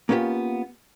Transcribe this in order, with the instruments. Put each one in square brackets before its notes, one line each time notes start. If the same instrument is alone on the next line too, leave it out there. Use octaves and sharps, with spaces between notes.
[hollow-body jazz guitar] A#3 B3 C#4 F4 G4